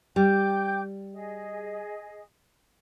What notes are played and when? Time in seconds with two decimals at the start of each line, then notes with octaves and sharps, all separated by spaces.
0.16 G3 G5 D6 G6
1.14 G#4 D#5